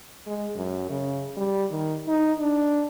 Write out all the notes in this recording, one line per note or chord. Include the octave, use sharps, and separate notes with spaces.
G#3
F#2
C#3
G3
D#3
D#4
D4